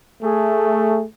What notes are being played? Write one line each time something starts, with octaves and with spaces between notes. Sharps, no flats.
A3 G#4